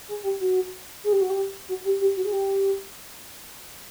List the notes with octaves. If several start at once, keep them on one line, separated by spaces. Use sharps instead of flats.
G#4
G4
F#4
G#4
G4
F#4
G4
F#4
G4
G4
F#4
G#4
G4